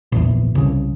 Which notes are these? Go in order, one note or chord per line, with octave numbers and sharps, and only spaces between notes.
A#1 E2
C2 C#3